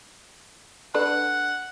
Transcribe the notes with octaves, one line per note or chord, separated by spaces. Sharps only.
D4 A4 B4 F#5